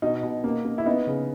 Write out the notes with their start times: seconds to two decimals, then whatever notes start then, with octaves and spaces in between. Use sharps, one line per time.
0.02 B2 D#4
0.23 B2
0.44 A#3
0.65 A#3
0.78 E4
0.86 B3 D#4
1.07 C#3